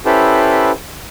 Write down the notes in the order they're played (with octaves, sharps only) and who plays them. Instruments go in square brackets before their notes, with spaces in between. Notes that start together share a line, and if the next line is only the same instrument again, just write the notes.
[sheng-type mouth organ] C#4 E4 G4 A4 B4 C5